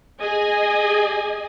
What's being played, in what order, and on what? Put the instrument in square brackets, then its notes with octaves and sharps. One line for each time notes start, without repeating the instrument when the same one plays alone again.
[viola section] G#4 D#5 G#5